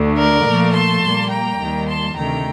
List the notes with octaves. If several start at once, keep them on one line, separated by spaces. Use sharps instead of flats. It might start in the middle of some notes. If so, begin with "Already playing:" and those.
Already playing: D2 D3 A3
A#4 D5
A#2 F3 A3
A5 C6
A#2 G3 A#3
G5 A#5
D#2 D#3 G3 A#3
A5 C6
D2 C3 D#3 A3 G5 A#5